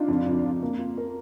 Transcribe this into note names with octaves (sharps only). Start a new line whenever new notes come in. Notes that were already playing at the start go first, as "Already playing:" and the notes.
Already playing: D4 D#4 F4
F2
F2
F2
A#3
F4
A#4